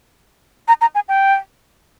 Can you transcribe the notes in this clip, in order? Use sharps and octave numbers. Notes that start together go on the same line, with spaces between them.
A#5
A#5
G#5
G5